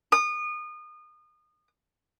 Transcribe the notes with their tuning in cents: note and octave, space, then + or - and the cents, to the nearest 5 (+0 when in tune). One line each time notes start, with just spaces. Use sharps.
D#6 -30